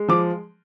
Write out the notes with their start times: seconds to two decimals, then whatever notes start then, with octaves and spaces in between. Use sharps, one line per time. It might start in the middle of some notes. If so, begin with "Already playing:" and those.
Already playing: G#3
0.09 F3 D6